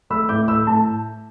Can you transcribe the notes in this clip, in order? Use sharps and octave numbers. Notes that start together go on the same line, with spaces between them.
A3 B5 E6
A2 D6 G6
A3 B5 E6
A2 A5